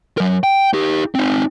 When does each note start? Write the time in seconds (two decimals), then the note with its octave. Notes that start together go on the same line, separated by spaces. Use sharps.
0.18 F#3 A#4
0.44 G5
0.73 D#4 G4
1.15 C4 D#4